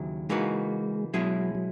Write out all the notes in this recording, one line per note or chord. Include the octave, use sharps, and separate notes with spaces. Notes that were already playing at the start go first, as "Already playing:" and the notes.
Already playing: D#2 C#3 F#3 E4
C#3 E3 G#3 A#3 D#4 F#4
B2 F#3 G#3 C#4 E4 G#4
F#3